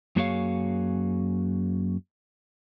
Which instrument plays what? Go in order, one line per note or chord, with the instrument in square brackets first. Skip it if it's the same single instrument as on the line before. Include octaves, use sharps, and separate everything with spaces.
[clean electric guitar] F#2 A#3 F#4 G#4 C#5 F5